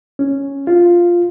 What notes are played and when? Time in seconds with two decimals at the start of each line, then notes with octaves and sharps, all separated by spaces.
0.19 C#4
0.67 F4